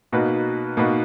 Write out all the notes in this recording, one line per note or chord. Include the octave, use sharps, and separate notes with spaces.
B2 A#3 D#4 F#4 B4
B2 A#3 D#4 F#4 B4